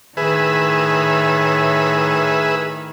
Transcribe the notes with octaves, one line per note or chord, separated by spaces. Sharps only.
A2 D#3 G#4 B4 E5